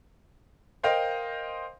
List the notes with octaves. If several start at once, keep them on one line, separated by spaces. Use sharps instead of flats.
A#4 C5 D#5 F5 G5 C6